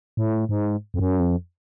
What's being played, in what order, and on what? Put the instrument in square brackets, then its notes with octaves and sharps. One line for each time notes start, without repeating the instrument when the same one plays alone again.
[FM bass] A2
G#2
F2
F#2
F2